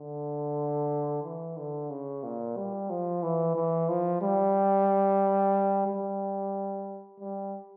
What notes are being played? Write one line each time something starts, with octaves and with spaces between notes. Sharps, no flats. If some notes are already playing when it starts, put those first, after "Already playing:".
Already playing: D3
E3
D3
C#3
A#2
G3
F3
E3
E3
F3
G3
G3
G3